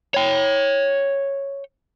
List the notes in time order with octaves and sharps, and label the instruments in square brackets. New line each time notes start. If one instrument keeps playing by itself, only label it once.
[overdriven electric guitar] C#5 G5